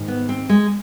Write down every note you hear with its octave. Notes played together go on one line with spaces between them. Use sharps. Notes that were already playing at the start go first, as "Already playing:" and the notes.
Already playing: G#2 D#3
B3
C4
G#3